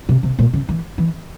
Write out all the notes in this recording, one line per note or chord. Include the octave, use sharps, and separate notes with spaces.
C3
C3
A#2
C#3
E3
E3